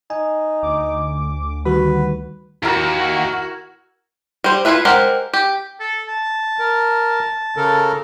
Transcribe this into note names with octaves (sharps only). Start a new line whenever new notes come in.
D#4 G#5
D2 D6
D#3 G3 F#4 B4
D#2 E4 F#4 A#4
G3 C5
E4 F4 G#4 B4 E5
G#3 G4 A#4 C5 F#5
G4
A4
A5
A#4
C#3 A4 A#4